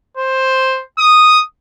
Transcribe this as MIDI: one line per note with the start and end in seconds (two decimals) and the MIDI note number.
0.17 0.82 72
0.99 1.39 87